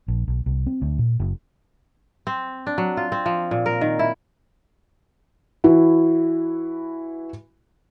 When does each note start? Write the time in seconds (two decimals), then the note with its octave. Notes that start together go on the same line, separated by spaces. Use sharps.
0.08 A#1
0.28 B1
0.46 C2
0.67 C4
0.82 D2
0.99 A#2
1.20 F#1
2.27 C4
2.67 D4
2.78 F#3
2.97 F4
3.12 C4
3.26 F3
3.51 A#2
3.66 A#4
3.81 D#3
3.99 E4
5.64 E3 E4 F#4